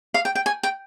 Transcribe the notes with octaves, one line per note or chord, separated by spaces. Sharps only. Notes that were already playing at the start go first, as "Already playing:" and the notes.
F5
G5
G5
G#5
G5